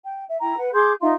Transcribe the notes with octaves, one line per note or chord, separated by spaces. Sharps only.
G5
E5
E4 G5 A#5
B4 F#5
G#4 C6 D6 G6
D#4 F4 E5 C6